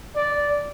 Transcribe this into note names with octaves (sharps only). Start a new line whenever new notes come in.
D5